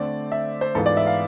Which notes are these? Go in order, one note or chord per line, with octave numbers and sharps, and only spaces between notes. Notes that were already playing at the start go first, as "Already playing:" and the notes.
Already playing: D3 A3 C4 D5
E5
C5
G#2 E3 B3 F4 A4
D5
E5
F5